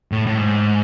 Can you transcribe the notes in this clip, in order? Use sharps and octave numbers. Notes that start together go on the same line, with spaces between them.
A2
A2
G#2